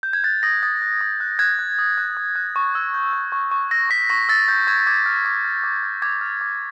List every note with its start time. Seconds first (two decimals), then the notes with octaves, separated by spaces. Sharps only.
0.03 G6
0.13 G#6
0.24 F#6 A6
0.43 D#6 A#6
0.63 D#6 A6
0.82 F#6
1.01 D#6
1.20 F#6
1.39 F#6 G#6
1.59 F#6
1.79 D#6
1.98 F#6
2.17 D#6
2.36 F#6
2.56 C#6
2.75 E6
2.94 G6
3.13 E6
3.32 C#6
3.51 C#6
3.71 E6 A#6
3.90 C#6 B6
4.10 C#6 A#6
4.29 E6 A6
4.48 E6 G6
4.67 C#6 G#6
4.87 D6 G#6
5.06 F6
5.25 D6
5.45 F6
5.64 D6
5.83 F6
6.02 D6 G#6
6.21 F6
6.41 D6